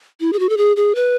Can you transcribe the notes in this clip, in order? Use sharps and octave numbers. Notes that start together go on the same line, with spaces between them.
E4
G#4
F#4
A4
G#4
G#4
B4